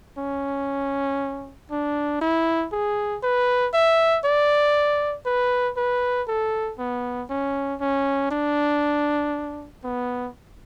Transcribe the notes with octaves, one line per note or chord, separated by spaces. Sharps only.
C#4
D4
E4
G#4
B4
E5
D5
B4
B4
A4
B3
C#4
C#4
D4
B3